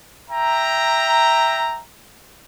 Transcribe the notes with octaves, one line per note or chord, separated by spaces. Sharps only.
E5 G5 A#5